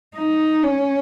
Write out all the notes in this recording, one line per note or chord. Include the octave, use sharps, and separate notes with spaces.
D#4
C#4